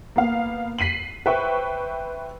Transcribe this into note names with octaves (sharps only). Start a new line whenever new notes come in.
A#3 B3 F5
B6 C7 D#7 F#7
B4 C5 E5 G5 C#6